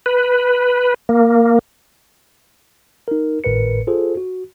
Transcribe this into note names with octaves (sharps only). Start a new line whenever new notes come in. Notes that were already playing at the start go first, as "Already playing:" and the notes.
B4
A#3
D#4 A#4
G#1 A2 A#4 B4 C#7
F4 G#4 A4 C5
F#4